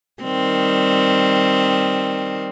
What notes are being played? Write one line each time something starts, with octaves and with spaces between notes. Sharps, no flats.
D#3 G3 C4